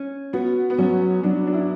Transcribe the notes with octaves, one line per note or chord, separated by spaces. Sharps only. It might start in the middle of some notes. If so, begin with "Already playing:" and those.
Already playing: C#4
B3 F#4
B3
F#3 C#4
F#3 D4
D4
E4